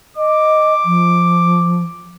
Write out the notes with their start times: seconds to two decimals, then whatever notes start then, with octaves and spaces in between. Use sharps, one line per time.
0.17 D#5 D6
0.85 F3